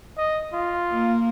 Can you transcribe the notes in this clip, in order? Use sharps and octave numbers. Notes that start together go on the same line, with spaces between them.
D#5
F4
A#3